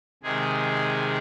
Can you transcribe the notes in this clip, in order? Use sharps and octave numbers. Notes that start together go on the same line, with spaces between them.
C3 D#3 G#3 G#4